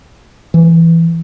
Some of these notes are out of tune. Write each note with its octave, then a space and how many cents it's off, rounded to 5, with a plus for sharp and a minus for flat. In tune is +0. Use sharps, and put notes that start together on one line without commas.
E3 +10